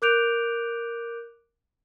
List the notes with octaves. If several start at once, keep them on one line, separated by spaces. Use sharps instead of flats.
A#4 D6 F#6 G6 D7 F7